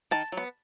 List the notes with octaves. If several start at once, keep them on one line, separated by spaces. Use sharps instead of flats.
D#3 A5
F#3 B3